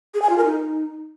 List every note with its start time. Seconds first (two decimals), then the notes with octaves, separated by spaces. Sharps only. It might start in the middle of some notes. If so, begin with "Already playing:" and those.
0.14 G#4
0.22 G#5
0.30 F4
0.37 A#4
0.45 D#4